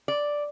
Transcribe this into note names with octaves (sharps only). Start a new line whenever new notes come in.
D5